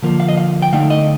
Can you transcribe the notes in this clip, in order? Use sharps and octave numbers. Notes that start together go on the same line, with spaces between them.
D3 F3 A#3
F5
D#5
F5
G5
D3 A3 D#4 F5
D#5